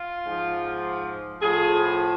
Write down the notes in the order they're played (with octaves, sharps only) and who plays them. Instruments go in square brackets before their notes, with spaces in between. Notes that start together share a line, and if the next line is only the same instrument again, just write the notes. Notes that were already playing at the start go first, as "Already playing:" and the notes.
Already playing: [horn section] F4
G#2 F3
A2 F3 G#4